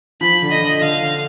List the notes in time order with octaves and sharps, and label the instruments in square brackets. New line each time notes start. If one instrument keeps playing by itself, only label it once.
[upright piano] F3 [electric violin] B5
[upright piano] D3
[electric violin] D#5
[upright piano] D3
[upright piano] D3 [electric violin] F5
[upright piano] D3